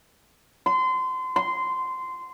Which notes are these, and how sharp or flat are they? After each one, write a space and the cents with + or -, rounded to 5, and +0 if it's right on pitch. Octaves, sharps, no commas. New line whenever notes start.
C6 -30
C6 -15